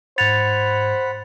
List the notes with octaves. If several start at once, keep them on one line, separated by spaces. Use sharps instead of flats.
G#2 C5 F#5 B5 G#6 A6 C#7 F7